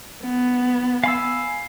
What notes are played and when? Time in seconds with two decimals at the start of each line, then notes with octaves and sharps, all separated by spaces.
0.23 B3
1.04 F5 G#5 B5 E6